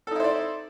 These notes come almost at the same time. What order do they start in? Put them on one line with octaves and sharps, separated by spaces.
A4 D#4 E4 C5 D5